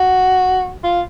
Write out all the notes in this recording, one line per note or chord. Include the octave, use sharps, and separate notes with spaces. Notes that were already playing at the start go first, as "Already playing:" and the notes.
Already playing: F#4
F4